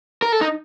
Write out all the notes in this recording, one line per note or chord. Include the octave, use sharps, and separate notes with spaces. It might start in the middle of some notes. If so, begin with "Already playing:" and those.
A#4
A4
D#4